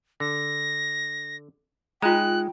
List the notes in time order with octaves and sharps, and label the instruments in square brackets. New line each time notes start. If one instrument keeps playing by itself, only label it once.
[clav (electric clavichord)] D3 [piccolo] A#6
[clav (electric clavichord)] G#3 D#4 [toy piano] F4 A#5 [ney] G5 [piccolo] F#6